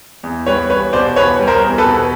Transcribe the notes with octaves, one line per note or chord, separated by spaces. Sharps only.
E2
G3 B4 C#5
E2 B4 C#5
B2 C5 D5
E2 B4 C#5
G3
A#4 C5
E2
A4 B4
B2